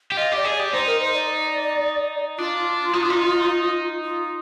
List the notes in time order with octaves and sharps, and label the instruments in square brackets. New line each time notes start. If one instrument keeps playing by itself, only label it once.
[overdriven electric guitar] G4
[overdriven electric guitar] F4 [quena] D#5
[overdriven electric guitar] G4 [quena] D5
[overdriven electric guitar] G#4
[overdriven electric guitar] G4 [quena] D5
[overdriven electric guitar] D#4 [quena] C5
[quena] A#4
C5
D5
[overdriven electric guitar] D4 [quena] F4
[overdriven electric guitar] D#4
D4
D#4
[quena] F4